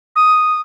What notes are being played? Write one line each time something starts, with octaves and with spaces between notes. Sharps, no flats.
D#6